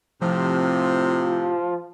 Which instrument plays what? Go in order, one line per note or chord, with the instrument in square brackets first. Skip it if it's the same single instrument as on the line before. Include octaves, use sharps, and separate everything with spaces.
[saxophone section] A2 C3 [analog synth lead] F3